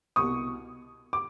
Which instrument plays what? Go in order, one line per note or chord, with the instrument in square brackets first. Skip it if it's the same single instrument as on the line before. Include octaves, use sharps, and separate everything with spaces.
[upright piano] C2 B2 C#6 D#6
D6